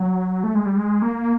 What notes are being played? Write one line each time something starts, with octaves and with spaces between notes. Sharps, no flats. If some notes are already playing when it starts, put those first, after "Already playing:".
Already playing: F#3
A3
G#3
G3
G#3
A#3